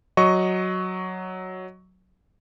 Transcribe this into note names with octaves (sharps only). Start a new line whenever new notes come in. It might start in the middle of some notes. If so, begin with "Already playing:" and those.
F#3 D#5 C#6